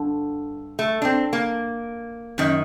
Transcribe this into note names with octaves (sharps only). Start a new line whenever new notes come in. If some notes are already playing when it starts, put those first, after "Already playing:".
Already playing: G2 D3
A3
D4
C4
A#3
F#2 D#3